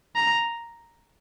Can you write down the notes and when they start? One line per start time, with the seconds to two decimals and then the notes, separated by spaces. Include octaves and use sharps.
0.16 A#5